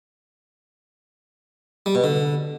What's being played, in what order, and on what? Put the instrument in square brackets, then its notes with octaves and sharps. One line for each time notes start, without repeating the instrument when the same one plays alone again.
[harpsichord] G3
B2
D3